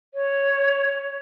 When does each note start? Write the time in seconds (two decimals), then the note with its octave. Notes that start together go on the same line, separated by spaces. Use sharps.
0.14 C#5